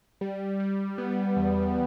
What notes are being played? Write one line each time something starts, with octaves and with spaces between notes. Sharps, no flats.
G3
G3
B3
E2